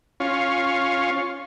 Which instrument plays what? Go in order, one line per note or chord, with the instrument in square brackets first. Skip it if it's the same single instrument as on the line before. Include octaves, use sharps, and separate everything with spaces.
[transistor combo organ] C#4 F4